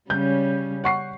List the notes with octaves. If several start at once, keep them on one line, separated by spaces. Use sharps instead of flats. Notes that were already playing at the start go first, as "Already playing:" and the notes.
C#3 G3 C#4 G6
F#5 C#6 C7